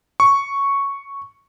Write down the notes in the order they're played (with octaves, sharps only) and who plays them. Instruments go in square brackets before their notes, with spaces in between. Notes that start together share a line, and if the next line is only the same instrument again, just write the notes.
[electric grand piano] C#6